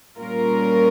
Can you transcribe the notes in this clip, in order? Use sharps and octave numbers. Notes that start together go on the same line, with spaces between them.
A#2 G3 C#4 F4 A#4